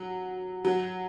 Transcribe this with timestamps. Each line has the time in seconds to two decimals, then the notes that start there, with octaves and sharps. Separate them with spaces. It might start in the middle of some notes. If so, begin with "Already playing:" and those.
Already playing: F#3
0.65 F#3